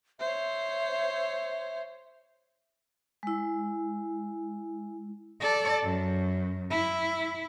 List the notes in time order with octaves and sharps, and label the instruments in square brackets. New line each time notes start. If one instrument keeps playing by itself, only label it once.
[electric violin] C5 C#5 [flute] E5
[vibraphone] G#3 E4
[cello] A4 D5
F#2
E4